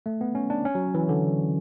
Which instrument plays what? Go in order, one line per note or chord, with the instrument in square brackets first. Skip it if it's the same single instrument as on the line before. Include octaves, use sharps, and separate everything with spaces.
[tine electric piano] A3
B3
C#4
D4
C#4
F#3
E3
D3